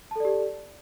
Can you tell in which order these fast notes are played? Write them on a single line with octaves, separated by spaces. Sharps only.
A5 A4 D5 G4